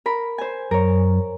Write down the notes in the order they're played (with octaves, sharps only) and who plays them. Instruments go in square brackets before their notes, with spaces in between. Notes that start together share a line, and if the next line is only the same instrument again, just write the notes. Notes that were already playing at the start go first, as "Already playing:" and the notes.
[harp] A#4 B5
C5 G#5
[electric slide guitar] F#2 [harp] A#4 C#5